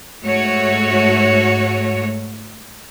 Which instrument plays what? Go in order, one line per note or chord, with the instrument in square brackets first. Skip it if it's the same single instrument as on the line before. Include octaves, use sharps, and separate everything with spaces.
[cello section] G#2 A3 F#4 C#5